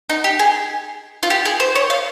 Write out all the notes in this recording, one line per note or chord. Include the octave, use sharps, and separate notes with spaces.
D#4
G4
G#4
F4
G4
G#4
C5
C#5
F5